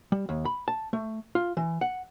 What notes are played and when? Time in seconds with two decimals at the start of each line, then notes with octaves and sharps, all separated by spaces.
0.12 G3
0.29 D#2
0.45 B5
0.68 A5
0.93 A3
1.35 F4
1.57 E3
1.81 F#5